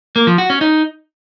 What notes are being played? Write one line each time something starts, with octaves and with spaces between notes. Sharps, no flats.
A#3
F3
F#4
C#4
D#4